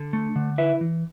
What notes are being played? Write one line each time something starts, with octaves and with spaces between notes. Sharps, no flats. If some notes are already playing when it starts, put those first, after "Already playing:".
Already playing: D3
A3
D3
E4 B4 E5
E3